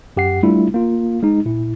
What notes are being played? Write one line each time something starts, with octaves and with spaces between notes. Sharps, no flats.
F#2 G4 F#5 C7
G3 A3 D4 E4 F4
A#3 F4
G#3 D#4
A#2 E4